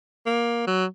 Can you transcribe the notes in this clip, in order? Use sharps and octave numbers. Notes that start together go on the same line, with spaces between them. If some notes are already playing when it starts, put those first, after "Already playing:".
A#3
F#3